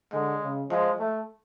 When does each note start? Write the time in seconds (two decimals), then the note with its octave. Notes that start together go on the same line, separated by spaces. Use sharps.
0.13 D3 G#3
0.42 C#3
0.70 F3 G#3
1.00 A3